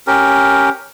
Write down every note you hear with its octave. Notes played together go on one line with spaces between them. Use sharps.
C#4 G4 A#4